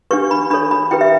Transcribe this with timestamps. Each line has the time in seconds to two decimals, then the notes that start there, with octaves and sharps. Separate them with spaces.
0.11 D4 G4 B4 C#6
0.31 B5
0.50 D4 A4 C#5 B5
0.71 B5
0.91 E4 G4 B4 G5
1.01 E5